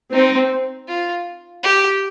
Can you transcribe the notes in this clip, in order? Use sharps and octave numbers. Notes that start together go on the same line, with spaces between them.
C4 D#4
F4
G4